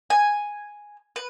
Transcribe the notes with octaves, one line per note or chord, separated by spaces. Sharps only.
G#5
B4